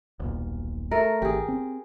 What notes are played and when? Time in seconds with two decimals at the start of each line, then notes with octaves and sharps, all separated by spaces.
0.20 D#1 B1 A#2
0.91 A3 A#4
1.22 G#1 G4 G#4
1.48 C4